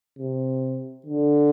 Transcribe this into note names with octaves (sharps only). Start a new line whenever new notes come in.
C3
D3